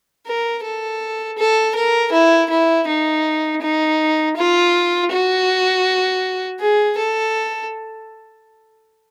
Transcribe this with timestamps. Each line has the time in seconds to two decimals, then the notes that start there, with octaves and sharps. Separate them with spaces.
0.26 A#4
0.63 A4
1.38 A4
1.75 A#4
2.12 E4
2.50 E4
2.87 D#4
3.61 D#4
4.36 F4
5.11 F#4
6.59 G#4
6.97 A4